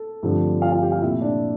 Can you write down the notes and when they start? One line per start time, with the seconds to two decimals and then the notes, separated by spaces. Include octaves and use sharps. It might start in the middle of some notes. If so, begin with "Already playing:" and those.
Already playing: A4
0.23 G2 D3 F3 A3 C4
0.62 F4 F5
0.72 F4 F5
0.82 G4 G5
0.92 F4 F5
1.02 C2 A#2 A3 E4 E5
1.21 D4 D5